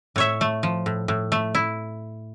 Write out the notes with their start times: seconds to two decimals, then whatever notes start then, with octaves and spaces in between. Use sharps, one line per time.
0.16 A2 C#5 E5
0.41 A3
0.63 F3
0.86 A2
1.08 A2
1.32 A3
1.55 E4